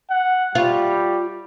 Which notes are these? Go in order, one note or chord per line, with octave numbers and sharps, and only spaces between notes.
F#5
G3 F4 C#5